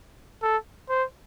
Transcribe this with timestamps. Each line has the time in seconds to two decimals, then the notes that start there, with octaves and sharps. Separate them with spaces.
0.43 A4
0.89 C5